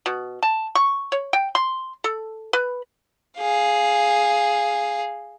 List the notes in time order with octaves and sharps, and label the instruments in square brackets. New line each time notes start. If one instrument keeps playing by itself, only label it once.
[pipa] B2
A5
C#6
C#5
G5
C6
A4
B4
[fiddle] G#4 F5